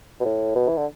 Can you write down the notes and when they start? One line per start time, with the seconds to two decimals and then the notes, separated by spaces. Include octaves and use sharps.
0.20 B2
0.25 A2
0.55 B2
0.68 E3
0.77 D3